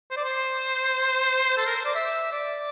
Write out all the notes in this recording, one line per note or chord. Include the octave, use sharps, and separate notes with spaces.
C5
D5
C5
A4
A#4
C5
D5
E5
D5